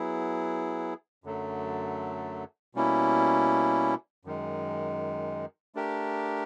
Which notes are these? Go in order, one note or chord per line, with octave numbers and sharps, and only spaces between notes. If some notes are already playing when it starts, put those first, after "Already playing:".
Already playing: F#3 B3 E4 G#4
F#2 D3 F#3 A3
B2 G3 A#3 C#4 E4
F#2 D#3 G#3
A3 D4 G4 A#4